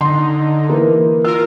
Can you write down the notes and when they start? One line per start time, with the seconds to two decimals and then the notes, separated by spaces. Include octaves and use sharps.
0.01 D3 D#4 C6
0.69 E3 A#3
1.24 F4 A#4 E6